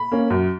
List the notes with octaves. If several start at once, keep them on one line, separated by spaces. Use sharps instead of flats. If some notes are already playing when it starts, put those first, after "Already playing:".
Already playing: B5
A#3 C#4
F#2